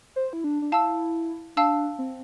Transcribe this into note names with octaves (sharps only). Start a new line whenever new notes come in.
C5
E4
D4
D4
E4 F5 A5 E6
D4 F5 A5 E6
C4